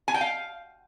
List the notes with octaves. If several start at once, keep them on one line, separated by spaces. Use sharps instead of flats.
G#5
G5
F5